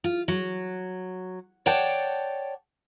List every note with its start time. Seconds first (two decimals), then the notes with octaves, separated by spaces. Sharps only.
0.04 F4
0.28 F#3
1.66 C#5 D5 F#5 G5 A5